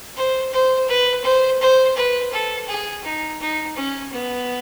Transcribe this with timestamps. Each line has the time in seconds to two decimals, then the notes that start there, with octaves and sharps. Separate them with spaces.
0.17 C5
0.53 C5
0.88 B4
1.24 C5
1.61 C5
1.97 B4
2.33 A4
2.68 G#4
3.04 D#4
3.40 D#4
3.76 C#4
4.12 B3